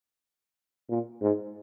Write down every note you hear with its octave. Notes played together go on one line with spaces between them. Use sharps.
A#2
G#2